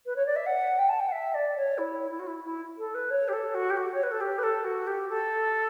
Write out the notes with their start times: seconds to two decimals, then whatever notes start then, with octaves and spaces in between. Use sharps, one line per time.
0.06 B4
0.16 C#5
0.26 D5
0.36 E5
0.46 F#5
0.78 G5
0.89 A5
1.00 G5
1.08 F#5
1.12 E5
1.34 D5
1.56 C#5
1.78 E4
2.11 E4
2.19 F#4
2.27 E4
2.44 E4
2.78 A4
2.95 B4
3.11 C#5
3.28 G4
3.33 A4
3.54 F#4
3.70 G4
3.77 F#4
3.94 C#5
4.03 B4
4.11 A4
4.21 G4
4.39 B4
4.43 A4
4.64 F#4
4.87 G4
5.09 A4